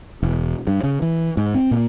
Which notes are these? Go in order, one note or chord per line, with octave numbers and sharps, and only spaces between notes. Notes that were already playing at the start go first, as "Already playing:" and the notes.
E1
G2
C#3
E3
G#2
C4
A#2